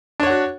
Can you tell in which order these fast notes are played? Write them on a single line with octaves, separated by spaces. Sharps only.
D4 C#5 F#5 F#4